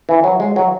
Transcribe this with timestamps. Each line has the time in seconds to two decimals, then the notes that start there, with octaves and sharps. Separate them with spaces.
0.09 E3
0.24 F#3
0.40 G#3
0.56 F#3